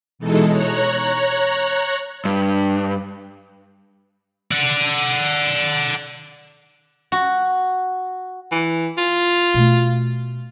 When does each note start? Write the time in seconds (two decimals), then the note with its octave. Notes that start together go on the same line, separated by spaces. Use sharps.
0.19 B2 E3 G#3 D#4 A4
0.48 C#5 A#5 F#6
2.25 G2
4.51 D5 F#5
7.12 F#4
8.52 E3
8.98 F4
9.54 B2 A3